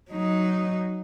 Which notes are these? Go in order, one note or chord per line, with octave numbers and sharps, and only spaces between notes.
F#3 D#4